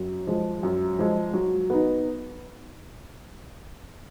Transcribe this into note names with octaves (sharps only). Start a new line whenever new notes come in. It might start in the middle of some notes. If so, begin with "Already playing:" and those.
Already playing: F#2
F3 G#3
F#2
F3 G#3
F#3
B3 D#4